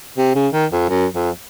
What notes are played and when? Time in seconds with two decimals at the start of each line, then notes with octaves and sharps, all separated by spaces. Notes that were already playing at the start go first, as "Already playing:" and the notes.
0.18 C3
0.35 C#3
0.53 D#3
0.71 F2
0.89 F#2
1.13 F2